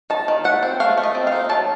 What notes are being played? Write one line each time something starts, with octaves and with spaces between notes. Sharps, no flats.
D#4 A5
D#3
A3 F#5
C4
A3 F5
A3
D#5
C4
F5
D#4
F#3 A5